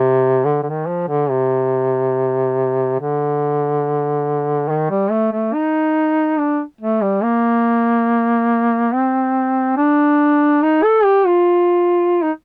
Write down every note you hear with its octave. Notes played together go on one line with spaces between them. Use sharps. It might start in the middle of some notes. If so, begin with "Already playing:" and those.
Already playing: C3
D3
D3
D#3
F3
D3
C3
D3
D#3
G3
A3
A3
D#4
D4
A3
G3
A#3
C4
D4
D#4
A4
G4
F4
D#4